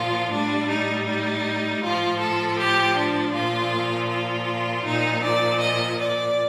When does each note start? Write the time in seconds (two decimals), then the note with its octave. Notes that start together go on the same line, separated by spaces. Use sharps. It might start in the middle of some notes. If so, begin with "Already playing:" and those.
Already playing: A#2 F3 F4
0.31 A2 G3 D4
0.70 D#4
1.06 D#4
1.83 A2 F3 F4
2.20 A4
2.58 G4
2.96 D4
3.34 A#2 F3 F4
4.09 F4
4.85 A#2 F3 D#4
5.23 D5
5.60 D#5
5.99 D5